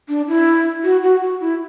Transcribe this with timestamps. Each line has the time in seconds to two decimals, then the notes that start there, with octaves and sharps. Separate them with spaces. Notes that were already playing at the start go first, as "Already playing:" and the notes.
0.09 D4
0.28 E4
0.84 F#4
1.02 F#4
1.22 F#4
1.41 E4